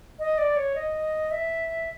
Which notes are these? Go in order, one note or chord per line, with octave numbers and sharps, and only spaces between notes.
D#5
D5
C#5
D#5
E5